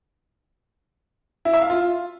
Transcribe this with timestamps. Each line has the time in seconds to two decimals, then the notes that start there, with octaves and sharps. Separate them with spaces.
1.45 E4
1.53 E5
1.62 F5
1.70 F4